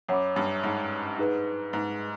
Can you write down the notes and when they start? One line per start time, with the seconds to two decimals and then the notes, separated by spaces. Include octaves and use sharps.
0.08 F#2 C#5 F#5 B5 D6
0.36 G2
0.63 G#2
1.18 D#4 G#4 B4
1.73 G#2